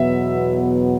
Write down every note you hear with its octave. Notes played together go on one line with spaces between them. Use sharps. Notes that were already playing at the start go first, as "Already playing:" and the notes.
Already playing: E2 B2 F#3 B3 E5